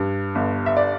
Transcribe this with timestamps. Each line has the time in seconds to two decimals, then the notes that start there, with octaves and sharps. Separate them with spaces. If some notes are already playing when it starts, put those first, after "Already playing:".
Already playing: G2
0.35 G1
0.66 E5
0.77 D5